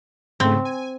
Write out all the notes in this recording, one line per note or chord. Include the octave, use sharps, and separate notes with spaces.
G#2 C#3 A3 C4
G#5